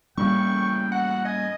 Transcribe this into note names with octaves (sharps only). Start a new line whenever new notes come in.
E2 A2 C#3 G3 A#3 G5 C#6
F#4 F#5
D#5 G#5